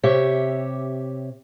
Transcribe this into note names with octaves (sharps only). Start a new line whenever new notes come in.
C3 G4 C#5 E5